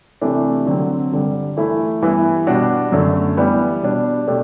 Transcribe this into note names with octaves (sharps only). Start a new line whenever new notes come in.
C3 E3 A3 D4
D3 F#3 C4
G2 D3 G3
E3 A3 E4
G2 E3 B3 E4
B2 G3 D4 F#4
F#2 D3 A3
E3 G3 B3
B2 G3 D4
B2 A3 D4 G4